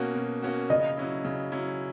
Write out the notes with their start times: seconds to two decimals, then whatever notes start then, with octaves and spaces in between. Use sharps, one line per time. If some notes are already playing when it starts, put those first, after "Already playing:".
Already playing: B2 A#3 C#4 F#4
0.16 B2
0.42 A#3 C#4 F#4
0.70 C#3 D#5
0.97 F#3 C#4 E4
1.25 C#3
1.52 F#3 C#4 E4